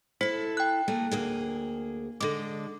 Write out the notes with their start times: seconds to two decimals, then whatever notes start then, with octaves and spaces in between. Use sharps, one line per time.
0.21 E4 A4 C5 B6
0.57 G5 F#6
0.88 A3 A#3 G#4
1.11 D2 A#3 G#4
2.21 D3 G#3 A4 D6